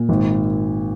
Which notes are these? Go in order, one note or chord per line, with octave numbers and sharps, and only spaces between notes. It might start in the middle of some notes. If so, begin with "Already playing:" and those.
Already playing: A#2
G#1